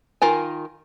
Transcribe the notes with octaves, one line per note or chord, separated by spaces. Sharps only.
D#3 F4 A#4 G#5